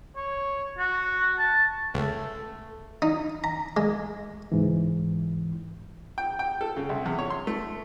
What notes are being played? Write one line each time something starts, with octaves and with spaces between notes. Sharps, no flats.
C#5
F#4
A5
C#2 A3 A4
D#4
A#5
G#3
C#2 G#2 E3
G5
G5
A4
C#3
C2
E2
C#5
C6
A3